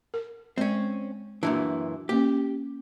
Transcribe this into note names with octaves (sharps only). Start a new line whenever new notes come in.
A#4
G#3 C4 C#4 D5
F#2 A#2 E3 D4
A#3 C#4 G4